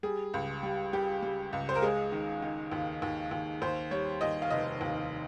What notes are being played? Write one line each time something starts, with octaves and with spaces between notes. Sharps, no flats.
G3 G#4
C#2
G3
G3 G4
G3
C#2
C5
A#4
G#3 G#4
D#3
D#3
D#2
D#2
D#2
D#2 C5
G3 C#5
D#2 D#5
F5
F1 D#5
D#2